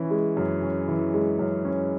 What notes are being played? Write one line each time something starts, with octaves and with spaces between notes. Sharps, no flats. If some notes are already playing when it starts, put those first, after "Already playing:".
Already playing: E3 C#4
G#3
F#2
C#4
E3
G#3
F#2
C#4